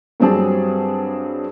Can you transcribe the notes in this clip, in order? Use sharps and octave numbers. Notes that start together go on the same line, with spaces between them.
G2 F#3 G3 C4 G#4 A5